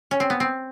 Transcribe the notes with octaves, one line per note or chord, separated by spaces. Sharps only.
C#4
C4
B3
C4